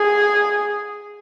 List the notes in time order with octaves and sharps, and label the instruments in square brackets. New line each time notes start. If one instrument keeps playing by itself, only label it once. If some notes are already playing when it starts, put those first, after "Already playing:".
Already playing: [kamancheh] G#4